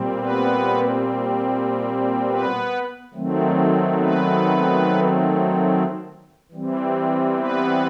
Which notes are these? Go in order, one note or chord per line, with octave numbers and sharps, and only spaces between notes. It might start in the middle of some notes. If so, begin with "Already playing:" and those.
Already playing: A#2 G3 C4
B3 B4
B3 B4
D#3 F#3 A3 C4
B3 B4
E3 G3 C4
B3 B4